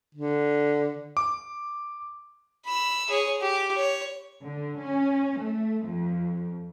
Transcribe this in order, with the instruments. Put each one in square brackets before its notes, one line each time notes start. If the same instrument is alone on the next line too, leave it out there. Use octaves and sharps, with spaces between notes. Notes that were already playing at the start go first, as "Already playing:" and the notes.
[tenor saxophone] D3
[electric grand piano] D6
[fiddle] B5 E6
G#4 C#5
G4
C#5
[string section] D3
C#4
A3
F2